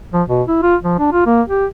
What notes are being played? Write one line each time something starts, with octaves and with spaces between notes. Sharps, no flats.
F3
B2
E4
F4
F3
D4
F4
A#3
G4